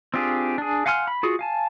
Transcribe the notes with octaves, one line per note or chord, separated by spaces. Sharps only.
C4 D4 F4 G4 G#4
D4 G#4
F5 F#5 G#5 C6 F6
B5
F4 F#4 G#4
F5 G#5 A5